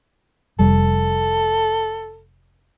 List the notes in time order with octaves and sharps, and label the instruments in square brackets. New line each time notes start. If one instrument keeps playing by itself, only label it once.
[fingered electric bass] F1 G3 [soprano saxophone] A4